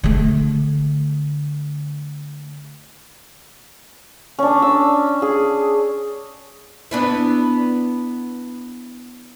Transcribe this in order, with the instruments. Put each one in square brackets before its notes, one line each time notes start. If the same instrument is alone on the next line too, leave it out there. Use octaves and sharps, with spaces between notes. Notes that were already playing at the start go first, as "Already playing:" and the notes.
[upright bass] D3 A3
[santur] C#4 D4
E6
G#4
[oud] B3 D4 E4